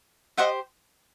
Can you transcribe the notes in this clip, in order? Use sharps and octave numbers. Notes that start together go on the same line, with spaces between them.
G4 C5 D#5 E5 F#5